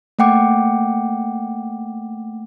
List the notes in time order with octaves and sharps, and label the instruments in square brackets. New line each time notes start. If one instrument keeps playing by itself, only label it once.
[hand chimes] A3 A#3 F#5 G5 D6